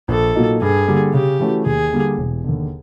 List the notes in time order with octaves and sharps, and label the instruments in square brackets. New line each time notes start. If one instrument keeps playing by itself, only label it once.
[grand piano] A#1 [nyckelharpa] A4
[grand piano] A#2 F#3 A#3 D#4
[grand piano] G2 [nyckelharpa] G#4
[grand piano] D3 G3 A#3
[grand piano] C#3 [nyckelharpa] G4
[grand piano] E3 A3 C#4 F#4
[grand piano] D#2 [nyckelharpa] G#4
[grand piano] D3 G3 A#3
E1
D#2 D3